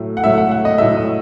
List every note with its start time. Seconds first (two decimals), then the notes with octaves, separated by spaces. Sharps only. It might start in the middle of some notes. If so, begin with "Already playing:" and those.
Already playing: A2 F#3 A3
0.17 F#5
0.24 A2 F#3 A3 E5
0.38 F#5
0.51 F#5
0.65 D#5
0.78 A2 F#3 A3 E5
0.97 D#5